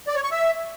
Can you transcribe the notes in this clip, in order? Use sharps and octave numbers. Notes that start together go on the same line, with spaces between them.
D5
C#5
C#6
E5